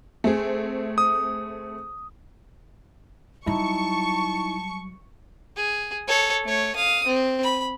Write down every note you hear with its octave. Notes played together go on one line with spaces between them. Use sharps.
A3 C4 G#4
D#6
F#3 G3 D#4 E4 A5 C#6
G#4
A4 C#5
A3 C#5
F5 D#6
C4
B5